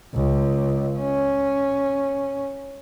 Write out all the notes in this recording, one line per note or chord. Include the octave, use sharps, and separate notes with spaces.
C#2
C#4